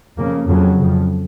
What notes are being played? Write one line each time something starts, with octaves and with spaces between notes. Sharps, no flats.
F2 C#3 A#3
F2 C#3 F#3
F2 C#3